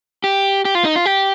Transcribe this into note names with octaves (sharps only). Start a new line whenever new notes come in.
G4
G4
F4
D#4
F4
G4